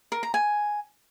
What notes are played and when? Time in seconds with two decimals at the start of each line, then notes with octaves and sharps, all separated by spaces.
0.12 A#4
0.23 A#5
0.34 G#5